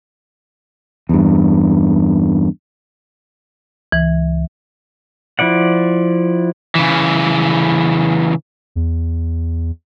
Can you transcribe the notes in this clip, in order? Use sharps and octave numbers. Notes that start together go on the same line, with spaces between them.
E2 G2
C#2 E3
F3 E4 D5 F#5
C#3 E3
E2